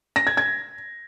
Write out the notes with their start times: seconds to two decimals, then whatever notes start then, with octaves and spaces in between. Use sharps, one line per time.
0.16 A#6
0.27 G#6
0.37 G#6